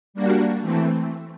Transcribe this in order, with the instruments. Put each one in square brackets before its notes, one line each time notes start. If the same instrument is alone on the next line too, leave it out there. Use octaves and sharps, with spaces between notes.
[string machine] G3 A#3 D4 F#4
E3 A3 C4